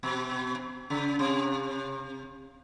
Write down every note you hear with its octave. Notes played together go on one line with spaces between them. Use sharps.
B2
C#3
C3